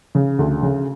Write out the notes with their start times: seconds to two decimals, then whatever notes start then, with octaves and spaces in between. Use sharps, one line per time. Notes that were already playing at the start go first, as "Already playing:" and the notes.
0.15 C#3
0.39 D2
0.62 C#3